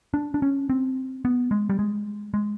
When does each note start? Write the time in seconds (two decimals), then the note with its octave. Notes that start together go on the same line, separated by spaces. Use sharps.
0.14 D4
0.34 D4
0.42 C#4
0.70 C4
1.25 B3
1.51 G#3
1.70 G3
1.79 G#3
2.34 G#3